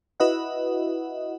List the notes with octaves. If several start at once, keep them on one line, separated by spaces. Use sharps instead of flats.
E4 F#4 B4 D#5 E5 F#5